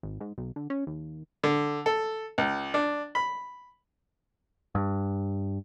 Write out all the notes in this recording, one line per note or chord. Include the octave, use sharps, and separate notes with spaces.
G#1
G#2
B1
D3
C#4
D#2
D3
A4
C#2
D4
B5
G2